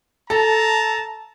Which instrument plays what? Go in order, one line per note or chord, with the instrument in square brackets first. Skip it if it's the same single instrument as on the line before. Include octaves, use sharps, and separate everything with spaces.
[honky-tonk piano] A4 [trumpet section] A5 A#5